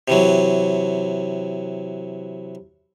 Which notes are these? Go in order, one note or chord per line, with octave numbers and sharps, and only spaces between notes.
C3 E3 F#3